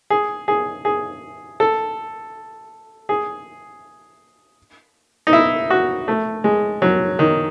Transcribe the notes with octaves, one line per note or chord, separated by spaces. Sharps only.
G#4
G#4
G#4
A4
G#4
D#4
E4
F#4
A3
G#3
F#3
D#3